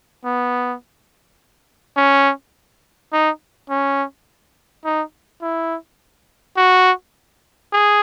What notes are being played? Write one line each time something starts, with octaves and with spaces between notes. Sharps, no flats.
B3
C#4
D#4
C#4
D#4
E4
F#4
G#4